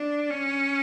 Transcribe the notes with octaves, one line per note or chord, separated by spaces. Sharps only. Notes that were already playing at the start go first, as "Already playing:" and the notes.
Already playing: D4
C#4